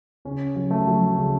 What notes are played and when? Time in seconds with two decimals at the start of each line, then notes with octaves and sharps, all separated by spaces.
0.25 C#3 C#4
0.56 F#3
0.71 A3
0.87 F#3
1.18 C#3